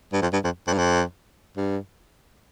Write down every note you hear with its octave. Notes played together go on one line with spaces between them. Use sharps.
G2
F2
G2
F2
F2
G2
F2
G2